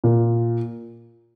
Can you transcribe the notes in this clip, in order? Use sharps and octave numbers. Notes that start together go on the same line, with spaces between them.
A#2